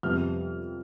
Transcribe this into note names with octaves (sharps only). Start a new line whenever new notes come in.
F2 C3 G3 B3 F6